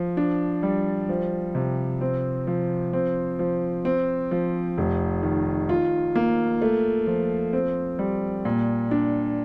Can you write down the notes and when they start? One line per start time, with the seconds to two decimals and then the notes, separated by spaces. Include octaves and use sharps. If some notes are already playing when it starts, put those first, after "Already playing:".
Already playing: F3
0.17 D4
0.63 G3
1.09 F3
1.55 C3
2.01 C4
2.47 F3
2.93 C4
3.39 F3
3.85 C4
4.31 F3
4.78 F1
5.23 D#3
5.69 F4
6.15 A#3
6.62 A3
7.07 F3
7.53 C4
7.99 G3
8.45 A#2
8.91 D4